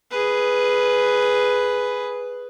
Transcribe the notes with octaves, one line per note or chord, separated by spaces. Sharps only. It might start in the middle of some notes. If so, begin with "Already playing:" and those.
G#4 B4